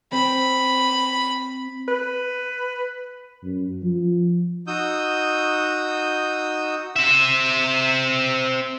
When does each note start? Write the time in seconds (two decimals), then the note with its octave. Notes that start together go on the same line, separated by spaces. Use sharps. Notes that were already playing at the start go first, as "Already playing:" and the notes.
0.13 C4 B5
1.88 B4
3.43 F#2
3.83 F3
4.67 D#4 F#4 D#6 E6 G6
6.96 C4 E5